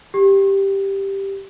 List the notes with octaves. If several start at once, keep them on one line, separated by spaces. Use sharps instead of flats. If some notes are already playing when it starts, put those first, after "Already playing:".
G4